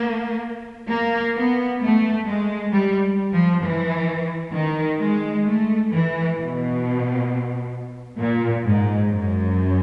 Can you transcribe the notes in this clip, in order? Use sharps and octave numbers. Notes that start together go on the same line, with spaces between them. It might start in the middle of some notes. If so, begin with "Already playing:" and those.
Already playing: A#3
A#3
B3
A3
G#3
G3
F3
E3
D#3
G#3
A3
E3
B2
A#2
G#2
F#2